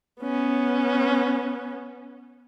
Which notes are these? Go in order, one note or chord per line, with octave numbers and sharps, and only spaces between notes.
B3 C#4